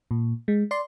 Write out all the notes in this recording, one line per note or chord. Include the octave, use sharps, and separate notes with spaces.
A#2
G#3
D5 C6